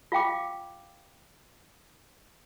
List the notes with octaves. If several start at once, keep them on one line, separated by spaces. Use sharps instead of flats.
F4 F5 G5 D6